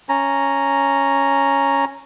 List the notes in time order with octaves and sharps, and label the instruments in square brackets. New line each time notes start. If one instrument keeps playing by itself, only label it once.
[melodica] C#4 A#5